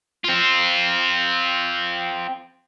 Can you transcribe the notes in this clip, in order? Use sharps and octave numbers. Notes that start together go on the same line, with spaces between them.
C4 F4